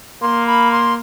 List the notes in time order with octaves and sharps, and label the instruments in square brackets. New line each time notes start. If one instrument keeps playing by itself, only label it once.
[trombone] A#3 [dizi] C6
[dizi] B5
C6